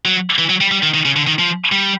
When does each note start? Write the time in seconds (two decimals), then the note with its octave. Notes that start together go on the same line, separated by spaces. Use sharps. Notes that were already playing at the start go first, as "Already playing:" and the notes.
0.05 F#3
0.38 E3
0.49 F#3
0.61 G3
0.72 G3
0.83 D#3
0.94 D#3
1.05 C#3
1.16 D3
1.27 D#3
1.39 F3
1.72 G3